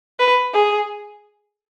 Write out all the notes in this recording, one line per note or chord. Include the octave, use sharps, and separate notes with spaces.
B4
G#4